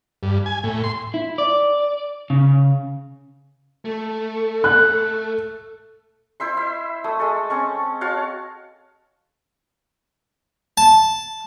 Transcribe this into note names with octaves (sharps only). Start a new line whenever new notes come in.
G2
G#5
A2
C6
E4
D5
C#3
A3
F#6
E4 C5 E5 C6
E5
A3 D#6
G#3 A4
C4 C#4 C#6
F#4 C#5 F5 A5
A5